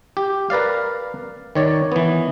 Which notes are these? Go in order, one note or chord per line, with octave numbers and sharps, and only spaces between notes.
G4
A#4 B4 D5 F5
D#3 C#5 D5
E3 B3